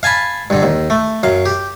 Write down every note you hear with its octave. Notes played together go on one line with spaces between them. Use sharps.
F5 G#5 A5 B5
G2 D3
D#2
A3
F#2 F5
G4